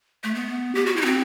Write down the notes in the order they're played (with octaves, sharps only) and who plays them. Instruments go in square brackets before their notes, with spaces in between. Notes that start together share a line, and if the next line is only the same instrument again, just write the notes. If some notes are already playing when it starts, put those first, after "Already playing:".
[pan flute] A3
B3
G4
F#4
E4
D#4
C4